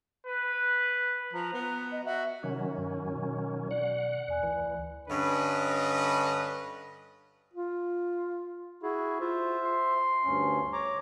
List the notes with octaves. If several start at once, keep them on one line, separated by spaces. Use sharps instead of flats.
B4
F3 A#5
B3
D#5
F#4 E5
C3 D#3 F#3 C#4
G2
B2
D5 F#5
E2 D5 G#5 F#6
D2 E3
G2 D3 C#4 B4 D#5
F4
E4 F#4 G#4
F4 C5 E5
C6
D2 G2 C#4
C#5 A#5 D6